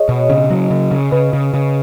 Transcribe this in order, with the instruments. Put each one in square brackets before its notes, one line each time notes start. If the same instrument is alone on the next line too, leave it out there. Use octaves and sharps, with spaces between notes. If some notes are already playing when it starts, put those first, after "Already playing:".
Already playing: [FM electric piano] G#4 C#5 D#5
[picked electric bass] B2
C#3
F#3
C#3
C#3
[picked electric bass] C#3 [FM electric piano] B4
[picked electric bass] C#3
C#3